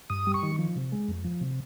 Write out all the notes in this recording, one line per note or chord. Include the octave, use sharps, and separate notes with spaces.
G2 D#6
G3
C#6
D#3
F3
C3
G#3
F2
F3
C3